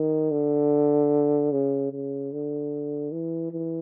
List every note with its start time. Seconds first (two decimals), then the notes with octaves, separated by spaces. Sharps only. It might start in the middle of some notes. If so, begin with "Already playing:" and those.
Already playing: D#3
0.31 D3
1.52 C#3
1.92 C#3
2.32 D3
3.12 E3
3.51 E3